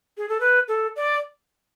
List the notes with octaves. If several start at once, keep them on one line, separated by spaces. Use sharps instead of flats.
G#4
A4
B4
A4
D5